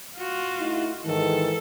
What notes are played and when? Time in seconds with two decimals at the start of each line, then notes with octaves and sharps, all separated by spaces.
0.17 F4 F#4
0.60 A3 D#4 E4
1.06 G#2 D#3 E3 A4